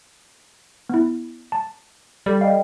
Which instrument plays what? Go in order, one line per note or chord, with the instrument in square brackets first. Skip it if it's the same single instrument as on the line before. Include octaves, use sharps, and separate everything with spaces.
[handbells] B3 E4
A5
[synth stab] G3 [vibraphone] G4 A4
[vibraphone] D5 D#5 G5 [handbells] F5